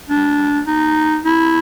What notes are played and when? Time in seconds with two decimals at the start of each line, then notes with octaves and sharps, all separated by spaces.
0.09 D4
0.67 D#4
1.25 E4